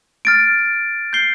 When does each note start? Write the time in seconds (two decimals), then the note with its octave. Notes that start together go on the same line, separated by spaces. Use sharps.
0.25 F6 A6 D7
1.13 G6 C7 G7